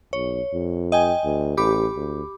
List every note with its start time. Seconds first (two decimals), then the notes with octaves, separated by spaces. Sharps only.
0.13 B1 C#5
0.53 F2
0.92 D#5 G5 G#5
1.24 D2
1.57 A1 G4 B5 D6
1.96 D2